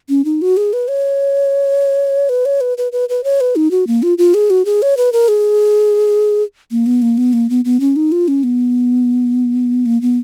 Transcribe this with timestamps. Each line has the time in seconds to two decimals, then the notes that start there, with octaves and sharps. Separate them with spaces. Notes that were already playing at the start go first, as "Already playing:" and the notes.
0.09 C#4
0.25 D#4
0.42 F#4
0.57 G#4
0.73 B4
0.88 C#5
2.29 B4
2.45 C#5
2.61 B4
2.78 B4
2.92 B4
3.09 B4
3.24 C#5
3.41 B4
3.56 D#4
3.71 F#4
3.87 A#3
4.03 F4
4.18 F4
4.34 G#4
4.50 F#4
4.65 G#4
4.82 C#5
4.97 B4
5.13 A#4
5.28 G#4
6.71 A#3
6.86 B3
7.02 A#3
7.18 B3
7.33 A#3
7.50 B3
7.65 B3
7.80 C#4
7.96 D#4
8.12 F4
8.28 C#4
8.43 B3
9.86 A#3
10.01 B3